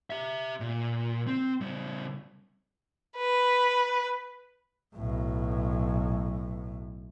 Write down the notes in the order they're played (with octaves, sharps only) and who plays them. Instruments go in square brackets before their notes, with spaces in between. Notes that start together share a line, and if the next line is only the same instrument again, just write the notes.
[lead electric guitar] G4 E5
A#2
C4
C#3 G3
[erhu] B4
[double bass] B1 A2